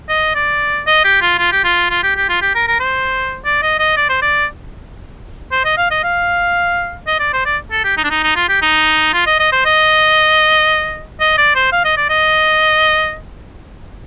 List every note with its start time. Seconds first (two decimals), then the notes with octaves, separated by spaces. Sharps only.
0.09 D#5
0.35 D5
0.87 D#5
1.05 G4
1.22 F4
1.38 F4
1.52 G4
1.64 F4
1.90 F4
2.03 G4
2.17 G4
2.29 F4
2.42 G4
2.55 A#4
2.68 A#4
2.80 C5
3.45 D5
3.63 D#5
3.79 D#5
3.97 D5
4.09 C5
4.22 D5
5.52 C5
5.65 D#5
5.78 F5
5.91 D#5
6.04 F5
7.07 D#5
7.20 D5
7.33 C5
7.46 D5
7.72 A4
7.84 G4
7.98 D#4
8.04 D4
8.11 D#4
8.23 D#4
8.36 F4
8.49 G4
8.62 D#4
9.14 F4
9.27 D#5
9.40 D#5
9.52 C5
9.65 D#5
11.21 D#5
11.38 D5
11.55 C5
11.72 F5
11.85 D#5
11.97 D5
12.10 D#5